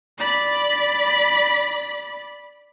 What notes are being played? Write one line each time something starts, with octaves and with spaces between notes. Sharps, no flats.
D5 B5